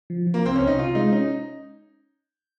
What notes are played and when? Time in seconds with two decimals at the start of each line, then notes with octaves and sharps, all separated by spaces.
0.10 F3
0.27 F3
0.34 A#3
0.44 C2 C4
0.55 C#4
0.61 C2
0.67 D#4
0.79 C3 F4
0.95 G#3 D#4
1.12 C#4 D#4